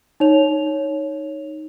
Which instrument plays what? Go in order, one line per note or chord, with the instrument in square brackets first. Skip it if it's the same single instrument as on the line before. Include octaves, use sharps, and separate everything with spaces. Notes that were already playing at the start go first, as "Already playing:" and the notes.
[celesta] D#4 C#5 F7